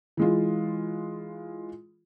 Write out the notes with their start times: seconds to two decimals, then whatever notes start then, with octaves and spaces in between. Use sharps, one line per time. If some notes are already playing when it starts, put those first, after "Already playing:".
0.17 E3 G#3 F4